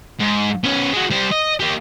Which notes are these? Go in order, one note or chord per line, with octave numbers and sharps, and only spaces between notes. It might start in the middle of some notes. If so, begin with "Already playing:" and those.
G#2
B3 C#4
G#3 F#4
G3 C5
D#5
A#3 G4